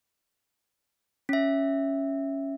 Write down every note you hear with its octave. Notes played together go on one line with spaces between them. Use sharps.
C#4 E5